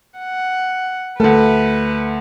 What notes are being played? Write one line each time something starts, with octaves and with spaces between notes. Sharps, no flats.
F#5
D2 A3 A4 B4